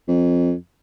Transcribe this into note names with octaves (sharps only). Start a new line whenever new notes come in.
F2